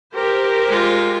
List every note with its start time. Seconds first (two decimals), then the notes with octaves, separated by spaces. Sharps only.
0.12 G4 A#4 C5
0.67 G#3 F4